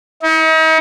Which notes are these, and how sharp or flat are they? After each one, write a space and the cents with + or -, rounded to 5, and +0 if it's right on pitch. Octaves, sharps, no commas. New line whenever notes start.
D#4 +40